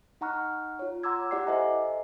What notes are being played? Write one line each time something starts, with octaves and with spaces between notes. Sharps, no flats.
D#4 F#5 A#5 C#6 F6 F#6
F4 C#5
F#5 A#5 C6 D6 E6 G#6
E4 G4 D5 F#5 D6 C7
A4 C5 D#5 E5 G#5 A#5